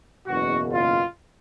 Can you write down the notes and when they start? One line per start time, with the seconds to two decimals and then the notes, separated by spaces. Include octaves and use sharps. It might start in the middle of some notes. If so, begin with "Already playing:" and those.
0.28 F#1 E2 B2 F#4
0.73 F4